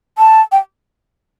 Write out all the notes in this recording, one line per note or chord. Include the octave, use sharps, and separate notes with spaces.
A5
G5